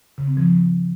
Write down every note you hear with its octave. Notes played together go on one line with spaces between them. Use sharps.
C#3
C4
F3